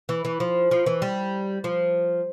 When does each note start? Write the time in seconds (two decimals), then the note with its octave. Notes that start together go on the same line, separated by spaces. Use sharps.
0.09 E3
0.25 E3
0.40 F3
0.71 F3
0.86 E3
1.02 G3
1.64 F3